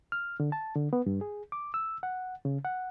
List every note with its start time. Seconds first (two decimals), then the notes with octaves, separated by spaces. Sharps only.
0.12 F6
0.40 D3
0.52 A5
0.75 D3
0.93 B3
1.06 G2
1.21 G#4
1.52 D6
1.74 E6
2.03 F#5
2.45 C#3
2.65 F#5